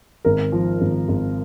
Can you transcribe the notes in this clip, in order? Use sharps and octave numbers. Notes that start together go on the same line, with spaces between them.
G#1 A#4
F3
G#1
G#1